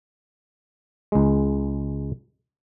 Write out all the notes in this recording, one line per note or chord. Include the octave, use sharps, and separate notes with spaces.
C#2 G#3